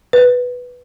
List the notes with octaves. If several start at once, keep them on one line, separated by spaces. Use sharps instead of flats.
B4